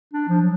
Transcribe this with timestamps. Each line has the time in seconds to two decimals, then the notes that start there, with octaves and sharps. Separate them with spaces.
0.13 D4
0.28 F3
0.42 F#3